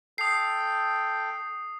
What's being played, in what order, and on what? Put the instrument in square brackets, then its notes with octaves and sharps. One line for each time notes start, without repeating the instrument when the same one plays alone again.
[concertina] A4 G5 [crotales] D#6 C7